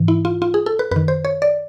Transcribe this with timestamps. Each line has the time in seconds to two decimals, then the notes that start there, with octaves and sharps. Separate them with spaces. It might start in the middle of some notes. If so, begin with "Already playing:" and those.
Already playing: G#2 E3
0.08 E4
0.25 F4
0.42 F4
0.54 G#4
0.66 A4
0.79 B4
0.91 F#2 D#3 B4
1.08 C5
1.25 C#5
1.42 D5